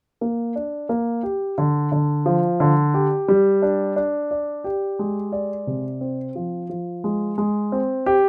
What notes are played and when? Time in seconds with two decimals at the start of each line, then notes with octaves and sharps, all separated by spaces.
0.21 A#3
0.56 D4
0.89 A#3
1.23 G4
1.58 D3
1.92 D3
2.26 F3
2.60 D3
2.94 G4
3.28 G3
3.62 D4
3.96 D4
4.31 D5
4.64 G4
4.99 G#3
5.32 D5
5.67 C3
6.01 C4
6.35 F3
6.69 F3
7.04 G#3
7.38 G#3
7.72 C4
8.06 G4